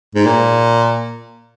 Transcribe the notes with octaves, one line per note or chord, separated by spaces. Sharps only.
G#2
A#2